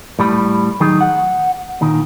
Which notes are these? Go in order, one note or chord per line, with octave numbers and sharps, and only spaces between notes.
A2 G3 B5
D#3 F#3 D#4 G#4
F#5
A#2 D#3